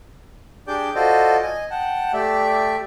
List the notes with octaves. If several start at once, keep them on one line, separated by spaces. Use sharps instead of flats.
D4 G4 G#4 D5 D6 G6
F4 F#4 A4 C5 D5 D#5
D#5 G#5
F#5 G5 A5
A3 G4 D5 E5